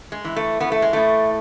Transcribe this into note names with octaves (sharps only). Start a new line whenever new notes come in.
G#3
E3
A3
E3 B3
A3
G#3
A2 A3